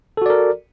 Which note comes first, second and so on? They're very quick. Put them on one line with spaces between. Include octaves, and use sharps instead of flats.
A4 F#4 D5 A#4